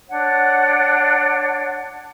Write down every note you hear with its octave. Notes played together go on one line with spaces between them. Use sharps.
D4 C#5 F#5